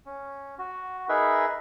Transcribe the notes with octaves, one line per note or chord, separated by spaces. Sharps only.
C#4
F#4
D#4 G#4 A#4 B4 E5